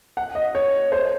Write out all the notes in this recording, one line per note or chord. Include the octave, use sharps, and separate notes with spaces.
F#5
D#5
C#5
C5